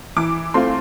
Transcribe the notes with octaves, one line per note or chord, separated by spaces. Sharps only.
E3 D6
A3 C4 F4 C6